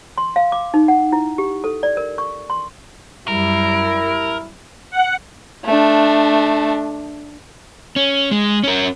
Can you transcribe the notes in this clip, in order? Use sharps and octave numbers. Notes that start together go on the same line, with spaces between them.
C6
F5
D6
D#4
F#5
E4
G4
A4
D5
A#4
C#6
C6
F#2 G3 E4 A#4
F#5
A3 D4
C#4
G#3
C#4 A#4